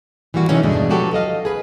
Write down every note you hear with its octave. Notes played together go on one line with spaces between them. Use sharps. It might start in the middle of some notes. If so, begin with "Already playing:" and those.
E3 G3 A#3 F#4
C3 D#3 E3 G#3 A3 C#4
E2 G2 B2 G#3 A3 D4
F3 F#3 F#4 G4 A4 B4
A4 D#5 F5
G#4 B4